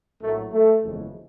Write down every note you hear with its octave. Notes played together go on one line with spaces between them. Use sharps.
A#1 A2 F#3 A3
A3
F#1 E2 C#3 F3 G#3